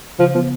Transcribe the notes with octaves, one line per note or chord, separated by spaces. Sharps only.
C#3 F3
F3 B3